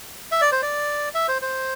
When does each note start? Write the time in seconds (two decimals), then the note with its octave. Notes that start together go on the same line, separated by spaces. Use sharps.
0.32 E5
0.41 D5
0.52 C5
0.62 D5
1.14 E5
1.28 C5
1.42 C5